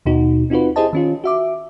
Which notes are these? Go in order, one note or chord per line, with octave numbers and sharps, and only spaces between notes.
D#2 B2 D#4 F#4
C4 D#4 F4 F#4 B4
E4 G4 G#4 C5 D#5 A5
D#3 C#4 F4
F#4 E5 D6